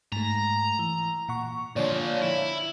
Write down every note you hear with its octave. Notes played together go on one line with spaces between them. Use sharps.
G#2 A3 A#5
E3
A#2 F#5 C#6
A#2 D3 F3 C#5 D5
E4